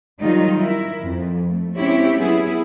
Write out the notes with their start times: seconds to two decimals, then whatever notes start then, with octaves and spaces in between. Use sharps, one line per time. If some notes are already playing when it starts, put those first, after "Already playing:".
0.21 D#3 F#3 G3 D#4 F4
0.60 E4 A#4
1.03 F2
1.44 A3
1.77 G#3 C4 C#4 E4 G4 C#5
2.16 F#3 B3 E4 G#4